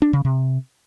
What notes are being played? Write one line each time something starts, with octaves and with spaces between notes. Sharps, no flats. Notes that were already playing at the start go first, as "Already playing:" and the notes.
D4
C#3
C3